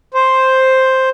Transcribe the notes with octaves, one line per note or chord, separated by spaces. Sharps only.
C5